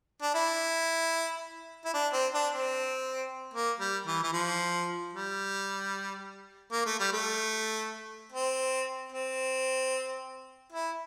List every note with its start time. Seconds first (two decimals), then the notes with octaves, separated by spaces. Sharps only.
0.22 D4
0.34 E4
1.85 E4
1.94 D4
2.13 C4
2.34 D4
2.53 C4
3.54 A#3
3.80 G3
4.06 E3
4.23 E3
4.33 F3
5.13 G3
6.72 A#3
6.86 A3
6.99 G3
7.13 A3
8.32 C4
9.12 C4
10.72 E4